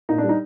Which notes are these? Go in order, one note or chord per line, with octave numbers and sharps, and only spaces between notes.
A#2 D#4
D4
G3
D#4